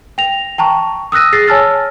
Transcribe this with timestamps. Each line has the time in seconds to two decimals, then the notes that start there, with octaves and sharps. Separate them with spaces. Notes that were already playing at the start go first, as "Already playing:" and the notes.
0.18 G5 A#6 F7
0.58 G5 A5 A#5 C#6
1.12 D#6 E6 F#6 A#6 D#7
1.33 G#4 A6 A#6 C7
1.47 C#5 G#5 A5 E6 F6 A6